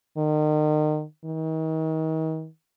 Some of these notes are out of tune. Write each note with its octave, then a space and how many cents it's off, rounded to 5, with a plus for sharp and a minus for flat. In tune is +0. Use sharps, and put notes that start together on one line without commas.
D#3 -35
D#3 +40